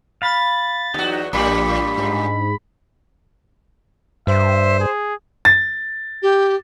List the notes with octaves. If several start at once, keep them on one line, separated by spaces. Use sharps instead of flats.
F5 B5 A6
E2 F#3 D#4 F#4 G4
A#1 A2 G3 A#3 D4 B5
G#2
G2 C5 E5
G#4
A6
G4